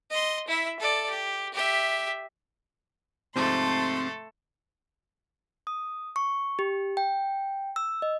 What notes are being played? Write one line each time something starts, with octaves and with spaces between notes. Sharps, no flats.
D#5 C6
E4 E5
A4 D5
G4
G4 E5
G#2 C3 F3 A3 C4 A4 C6
D#6
C#6
G4
G5
E6
D#5